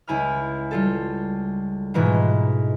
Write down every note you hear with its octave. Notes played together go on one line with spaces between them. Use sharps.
C#2 E4 G#5 B5 F6
G3 F4 A4
G#2 B2 E3 G#3 E4 F4